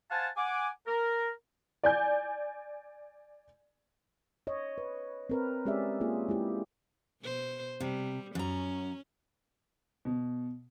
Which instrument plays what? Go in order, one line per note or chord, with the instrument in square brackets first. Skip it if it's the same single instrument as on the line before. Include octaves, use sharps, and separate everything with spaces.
[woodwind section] C5 F5 F#5 G#5 A5
F#5 G#5 D6
A#4
[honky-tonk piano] D5 G#5 G6
[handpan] C#5 D#5
B4
C4 A#4 B4
G#3 C#4 G4 G#4 D5 E5
A#3 F4 G#4
G#3 E4 G4
[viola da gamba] B2 C5
[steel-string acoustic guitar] C3 [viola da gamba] G3
[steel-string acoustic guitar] F#2 A#5 [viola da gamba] C#4
[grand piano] B2